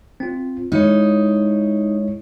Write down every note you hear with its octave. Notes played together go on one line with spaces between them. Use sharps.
C4 F4
G#3 D#4 E4 C#5